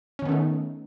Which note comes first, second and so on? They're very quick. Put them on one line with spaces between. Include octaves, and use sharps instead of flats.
C#4 D#3 B3 A3 D#4